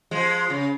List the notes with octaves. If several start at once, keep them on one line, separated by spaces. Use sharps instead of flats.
F3 G#3
C#3